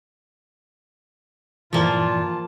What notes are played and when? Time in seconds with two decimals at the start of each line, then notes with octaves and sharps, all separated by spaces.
1.73 G2 A#2 E3 F3 A#3 F4 A5